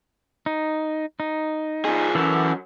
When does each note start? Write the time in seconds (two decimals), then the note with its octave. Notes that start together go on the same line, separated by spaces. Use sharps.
0.46 D#4
1.20 D#4
1.85 F3 G#4
2.15 F#2 E3 F#3 A4